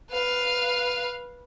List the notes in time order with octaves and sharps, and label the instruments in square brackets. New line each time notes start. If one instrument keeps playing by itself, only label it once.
[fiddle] B4 F5